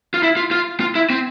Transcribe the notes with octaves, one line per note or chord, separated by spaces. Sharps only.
F4
E4
F4
F4
F4
E4
C4